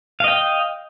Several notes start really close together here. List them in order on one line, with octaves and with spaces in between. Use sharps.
F5 D#5 G5